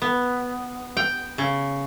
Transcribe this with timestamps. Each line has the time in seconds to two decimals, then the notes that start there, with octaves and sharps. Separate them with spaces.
0.02 B3
0.97 G5
1.38 C#3